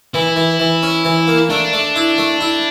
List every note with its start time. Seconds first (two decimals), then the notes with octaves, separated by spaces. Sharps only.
0.14 E3 E4
0.36 E3
0.60 E3
0.83 C#4
1.05 E3
1.27 A#3
1.50 A3 D4
1.73 A3
1.96 E4
2.18 A3
2.41 E4